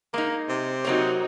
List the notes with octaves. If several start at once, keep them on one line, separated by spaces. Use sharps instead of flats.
G#3 A#3 D#4
C3
F#3 A#3 C4 D#4 F#4 C#5